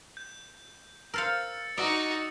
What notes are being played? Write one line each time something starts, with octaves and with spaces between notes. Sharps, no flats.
G6
A#4 C5 F5 E6 A6 C#7
D#4 F#4 D5 D#6 E6 C#7